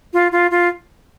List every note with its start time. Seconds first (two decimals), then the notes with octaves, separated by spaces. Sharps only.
0.13 F4
0.32 F4
0.51 F4